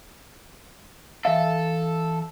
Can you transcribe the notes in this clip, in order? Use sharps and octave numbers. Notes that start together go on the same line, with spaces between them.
E3 A4 E5 F5